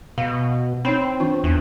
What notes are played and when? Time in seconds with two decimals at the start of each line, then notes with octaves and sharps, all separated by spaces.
0.18 B2 F5
0.85 C4 D#4 C#5 B5
1.20 E3 D4 F4
1.44 E2